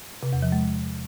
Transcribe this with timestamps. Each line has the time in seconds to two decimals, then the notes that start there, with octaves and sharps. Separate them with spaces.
0.23 C3
0.33 E2
0.42 F3
0.52 G#3